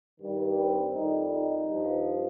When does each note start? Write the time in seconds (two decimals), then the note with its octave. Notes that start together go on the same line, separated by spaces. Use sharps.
0.20 G2 D#3 G3
0.57 C4
0.93 F2 D#3 G3 D#4
1.30 D#4
1.67 G2 F3